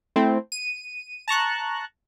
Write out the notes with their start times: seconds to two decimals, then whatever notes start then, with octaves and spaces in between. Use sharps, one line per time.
0.16 A3 C4 E4
0.52 D#7
1.28 A5 A#5 C#6 F#6